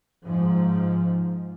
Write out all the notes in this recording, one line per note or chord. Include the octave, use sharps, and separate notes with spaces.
G#2 F3